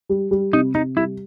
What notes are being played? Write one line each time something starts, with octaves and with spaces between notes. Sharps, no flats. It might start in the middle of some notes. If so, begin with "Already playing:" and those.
G3
G3
C3 D#4
C3 D#4
G3 E4